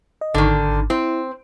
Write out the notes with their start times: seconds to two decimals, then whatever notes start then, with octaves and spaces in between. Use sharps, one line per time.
0.21 D#5
0.34 G#1 D3 D#3
0.90 C4 E4